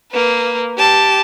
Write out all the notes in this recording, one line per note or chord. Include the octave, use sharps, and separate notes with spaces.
A#3 B4
G4 A5